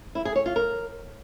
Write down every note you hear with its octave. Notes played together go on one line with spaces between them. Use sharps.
E4
G#4
C#5
F4
A#4